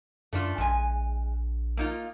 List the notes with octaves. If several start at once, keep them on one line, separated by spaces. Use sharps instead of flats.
F#2 A3 D4 F4
A#1 G#3 G#5
A#3 D#4 F4